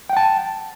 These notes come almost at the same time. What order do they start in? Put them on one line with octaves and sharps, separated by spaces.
G5 F#5 A5